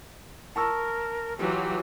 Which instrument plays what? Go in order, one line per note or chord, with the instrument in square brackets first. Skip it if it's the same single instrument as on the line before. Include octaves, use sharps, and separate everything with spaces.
[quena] A#4 [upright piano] A5 C#6 E6
[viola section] E3 F#3 F4 [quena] G4